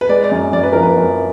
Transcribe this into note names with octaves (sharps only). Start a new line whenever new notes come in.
B4
G#3 D5
D5
F#2
F#2 D5
B4
F3 A#4
B4
F#2